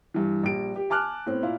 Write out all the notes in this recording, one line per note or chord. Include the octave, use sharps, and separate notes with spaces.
G2 E3
A#1 G3 D7
G4
G#5 A5 D6 F6 F#6
A2 B3 C4
A#2 E4 F5